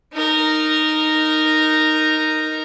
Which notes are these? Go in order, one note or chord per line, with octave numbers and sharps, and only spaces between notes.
D#4 A#4